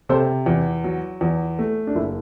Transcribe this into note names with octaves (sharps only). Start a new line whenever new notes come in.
C3 A4 C5
E2
F#3
E2
A3
D4
F#1 E4